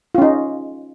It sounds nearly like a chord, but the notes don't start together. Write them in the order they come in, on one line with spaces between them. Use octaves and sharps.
F4 C#4 D#4